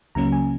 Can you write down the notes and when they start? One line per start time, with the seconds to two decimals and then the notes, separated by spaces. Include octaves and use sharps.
0.15 C#2 C#3 F#3 A#3 C#4 A#5
0.32 G#5